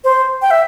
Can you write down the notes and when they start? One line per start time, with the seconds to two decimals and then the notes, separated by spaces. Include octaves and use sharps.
0.04 C5
0.42 G5
0.51 E5